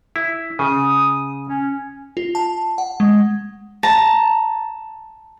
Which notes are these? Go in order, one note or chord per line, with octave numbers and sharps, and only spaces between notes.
E4
C#3 D#6
C#4
F4
A5
F#5
G#3
A5 A#5